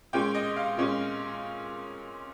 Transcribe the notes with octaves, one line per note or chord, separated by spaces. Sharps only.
A#2 G#3 C#4 G5
D#5
F5
A#2 G#3 C#4